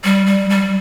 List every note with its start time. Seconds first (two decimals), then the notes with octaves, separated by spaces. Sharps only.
0.04 G3
0.27 G3
0.50 G3